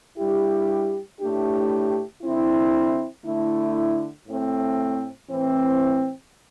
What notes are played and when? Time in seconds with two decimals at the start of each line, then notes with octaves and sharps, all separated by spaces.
0.18 G2 G3 E4 G4
1.20 A2 A3 D4 G4
2.22 D3 C4 E4
3.24 D3 A3 E4
4.26 A2 A3 C4
5.28 A2 E3 C4